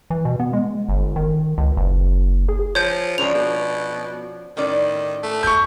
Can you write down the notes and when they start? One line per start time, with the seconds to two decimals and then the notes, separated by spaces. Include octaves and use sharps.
0.10 E3
0.25 B2
0.40 B3
0.53 G#3
0.89 G1
1.16 D#3
1.58 C#2
1.77 F#1
2.48 G#4
2.75 F3 C#5 G6
3.18 C#2 F3 C#4 D4 F7
3.34 B2
4.57 A2 D#3 C#4 D5
5.23 A3
5.43 C#6 G6